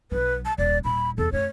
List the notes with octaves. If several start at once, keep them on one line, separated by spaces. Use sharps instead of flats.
B1 F#3 B4
A5
D#1 D5
D#1 A#2 B5
E2 A4
F#2 A3 C#5